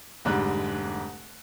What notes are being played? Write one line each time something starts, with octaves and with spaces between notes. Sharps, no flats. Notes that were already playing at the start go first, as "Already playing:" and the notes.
F1 G#2 D3 G3 F#6